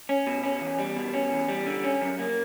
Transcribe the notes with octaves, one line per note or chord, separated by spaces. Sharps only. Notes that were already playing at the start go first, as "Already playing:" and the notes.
C#4
B2
C#4
E2
G3
B2
C#4
E2
G3
D3
C#4
F#2
A#3